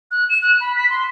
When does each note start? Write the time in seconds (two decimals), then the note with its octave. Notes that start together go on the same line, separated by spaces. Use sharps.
0.11 F#6
0.30 E7
0.42 F#6
0.61 B5
0.76 B6
0.90 C6